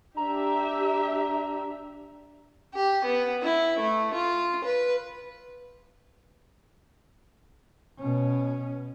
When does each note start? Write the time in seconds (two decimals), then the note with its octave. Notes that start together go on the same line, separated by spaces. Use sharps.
0.17 D4 G4 E5 A#5
2.74 G4
3.05 B3
3.43 E4
3.80 A3
4.15 F4
4.65 B4
7.99 B2 C#4